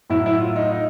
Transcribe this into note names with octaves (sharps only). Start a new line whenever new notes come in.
A2 F#3 E4
E4
F4
D#4
D#4